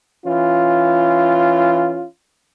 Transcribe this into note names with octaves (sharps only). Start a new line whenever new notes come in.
E3 C#4 F4